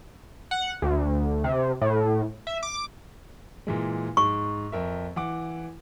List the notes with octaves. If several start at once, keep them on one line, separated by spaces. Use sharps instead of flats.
F#5
D2
C3
A2
E5
D6
A#2 E3 G#3
G#2 C#6
F2 A#4 E5
E3 F#5 D6